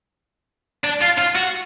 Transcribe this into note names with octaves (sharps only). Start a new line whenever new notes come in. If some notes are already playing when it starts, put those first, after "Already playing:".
D4
F4
F4
F#4